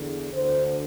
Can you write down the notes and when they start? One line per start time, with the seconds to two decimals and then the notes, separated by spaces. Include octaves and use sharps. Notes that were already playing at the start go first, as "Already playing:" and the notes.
Already playing: E2 D3
0.33 D2 D3 C5